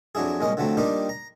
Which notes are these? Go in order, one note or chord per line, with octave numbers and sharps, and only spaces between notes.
F2 F#3 D4 E4 G#4
C2 A#2 G#3 C#4 D#5
D3 F3 F#3 A3 C4
G3 A#3 D4 D#4 F4 G4
A#5